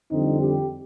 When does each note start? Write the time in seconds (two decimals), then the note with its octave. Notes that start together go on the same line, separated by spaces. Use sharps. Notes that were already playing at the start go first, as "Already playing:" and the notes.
0.11 F2 D3 G3 C4 D#4
0.41 G4